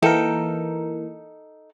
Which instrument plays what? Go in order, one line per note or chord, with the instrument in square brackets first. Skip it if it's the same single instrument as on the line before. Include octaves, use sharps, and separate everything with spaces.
[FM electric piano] E3 A#3 A#4 [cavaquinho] D#4 A4 G5